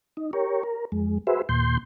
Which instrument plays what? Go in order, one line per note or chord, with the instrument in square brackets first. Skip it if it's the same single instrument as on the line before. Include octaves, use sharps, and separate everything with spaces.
[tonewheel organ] D#4
G4 A#4 C#5
A#4
F2 G#3
F#4 G#4 B4 C5 E5
D#2 A#2 C6 G6